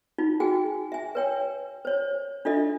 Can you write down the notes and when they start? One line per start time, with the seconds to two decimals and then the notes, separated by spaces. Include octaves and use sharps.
0.18 D#4 F4
0.40 F#4 G#4 G5 G#5
0.92 E5 G#5
1.15 B4 C#5 G5
1.85 C5 C#5
2.45 D4 F4 A4 D#5 E5